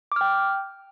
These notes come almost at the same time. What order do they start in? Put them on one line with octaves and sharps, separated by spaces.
D6 F6 G5